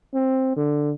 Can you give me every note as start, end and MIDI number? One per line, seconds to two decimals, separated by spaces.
0.14 0.56 60
0.56 0.92 50